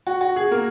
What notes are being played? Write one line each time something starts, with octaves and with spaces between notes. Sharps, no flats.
F#4
F#4
G#4
A#3 A#4